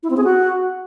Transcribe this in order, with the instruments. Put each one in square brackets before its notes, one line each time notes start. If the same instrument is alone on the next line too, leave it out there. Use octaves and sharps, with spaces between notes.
[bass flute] E4
C4
G#4
F#4